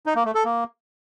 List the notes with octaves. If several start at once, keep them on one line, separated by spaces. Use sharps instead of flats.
D#4
A#3
A3
A4
A#3